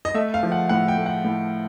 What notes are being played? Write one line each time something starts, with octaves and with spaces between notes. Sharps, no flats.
D#5
A3 E5
F5
F3
F#5
A2 F#5
G5
A3
F#5
A2